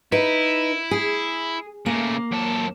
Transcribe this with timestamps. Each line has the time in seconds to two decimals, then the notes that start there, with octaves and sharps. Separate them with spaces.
0.12 D#4 E4 B4
0.91 G#4
1.86 C#3 A3 A#3
2.32 F#2 A4